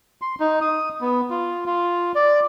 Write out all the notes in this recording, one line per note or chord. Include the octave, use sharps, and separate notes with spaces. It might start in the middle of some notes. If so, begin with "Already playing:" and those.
C6
D#4
D#6
B3
F4
F4
D5